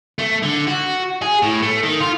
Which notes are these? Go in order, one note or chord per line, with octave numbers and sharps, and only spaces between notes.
A3
D3
F#4
G#4
A2
A3
D#3
F4